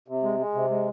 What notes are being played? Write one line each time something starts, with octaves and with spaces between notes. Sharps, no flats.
C3
G#3
G#3
C3
G#3